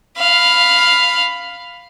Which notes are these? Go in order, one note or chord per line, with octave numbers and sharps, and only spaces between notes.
F5 B5